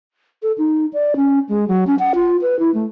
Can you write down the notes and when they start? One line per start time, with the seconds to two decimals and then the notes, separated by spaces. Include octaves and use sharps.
0.43 A4
0.58 D#4
0.93 D5
1.16 C#4
1.49 G#3
1.68 F#3
1.87 C#4
1.99 F#5
2.15 F4
2.42 B4
2.59 E4
2.74 A3